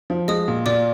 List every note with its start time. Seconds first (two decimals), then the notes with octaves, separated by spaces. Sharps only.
0.10 F3
0.28 G#3 D#5 D#6
0.48 A#2
0.66 A#2 D5 D6